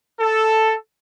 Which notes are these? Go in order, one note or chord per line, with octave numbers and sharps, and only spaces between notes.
A4